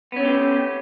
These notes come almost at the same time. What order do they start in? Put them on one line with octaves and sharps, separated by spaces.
B3 C#4 A3 G4